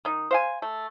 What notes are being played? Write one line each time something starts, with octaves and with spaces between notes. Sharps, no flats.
D#3 D#4
C5 F5 G#5
A3